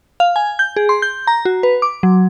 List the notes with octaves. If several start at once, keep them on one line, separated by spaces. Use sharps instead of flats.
F5
G#5
G6
G#4
C6
G6
A#5
F#4
B4
D6
F#3